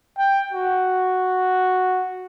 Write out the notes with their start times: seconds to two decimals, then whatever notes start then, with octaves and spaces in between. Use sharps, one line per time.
0.18 G5
0.53 F#4